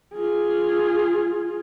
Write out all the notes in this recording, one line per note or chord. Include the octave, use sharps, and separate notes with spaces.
F4 G#4